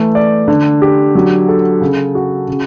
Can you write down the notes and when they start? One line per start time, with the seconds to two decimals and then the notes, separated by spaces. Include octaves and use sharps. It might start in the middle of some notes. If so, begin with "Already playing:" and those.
Already playing: E3 A3
0.15 D5
0.48 D3
0.82 G4
1.15 F#3
1.48 A4
1.81 C#3
2.15 F#4
2.48 C#3